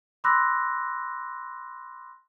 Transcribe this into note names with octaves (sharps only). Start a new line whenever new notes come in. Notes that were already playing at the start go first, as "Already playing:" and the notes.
B5 C6 D6 E6 F#6 A#6